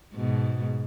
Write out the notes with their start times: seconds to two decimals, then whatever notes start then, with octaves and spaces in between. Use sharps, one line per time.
0.14 G#2 B2